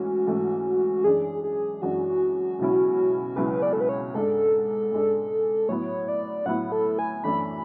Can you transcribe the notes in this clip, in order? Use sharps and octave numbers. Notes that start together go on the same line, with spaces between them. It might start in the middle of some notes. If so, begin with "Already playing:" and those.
Already playing: G#2 E3 A3 C#4 F#4
G#2 E3 A3 C#4
F#2 E3 G#3 D4 G#4
G#4
F#2 E3 G#3 D4 F#4
C#2 B2 F#3 C#4 E4
C#2 B2 F#3 C#4 E4 B4
D5
A4
B4
C#5
G#2 G#3 D4 A4
G#2 G#3 D4
A2 F#3 B3 E4 C#5
D5
A2 F#3 B3 E4 F#5
A4
G#5
F#2 E3 A3 D4 B5